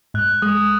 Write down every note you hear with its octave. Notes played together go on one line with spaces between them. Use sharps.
G#2 F#6
G#3 D#6